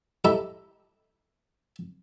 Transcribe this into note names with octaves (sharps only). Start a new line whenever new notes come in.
E4 G4 A4 D#5 A#5 B5